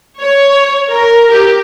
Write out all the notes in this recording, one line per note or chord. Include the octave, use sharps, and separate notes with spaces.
C#5
A#4
G4